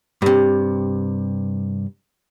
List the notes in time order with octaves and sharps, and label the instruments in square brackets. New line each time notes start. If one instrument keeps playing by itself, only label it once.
[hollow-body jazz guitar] G2 C3